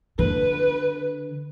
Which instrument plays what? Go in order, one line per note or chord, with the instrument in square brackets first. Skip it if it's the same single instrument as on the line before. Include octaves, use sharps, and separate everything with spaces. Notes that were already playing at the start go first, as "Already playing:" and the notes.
[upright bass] D3 [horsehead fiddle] B4